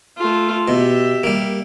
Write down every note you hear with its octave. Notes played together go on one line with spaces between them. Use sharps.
A3 F4
B2 G4 E5
G3 A#3